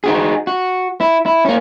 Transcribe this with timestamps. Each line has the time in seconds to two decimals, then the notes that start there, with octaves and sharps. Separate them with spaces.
0.04 D#4 F#4 G#4
0.47 F#4
1.01 E4
1.26 E4
1.45 A#3 C#4